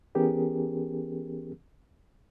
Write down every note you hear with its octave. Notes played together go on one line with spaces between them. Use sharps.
E3 B3 C#4 G4 G#4 A#4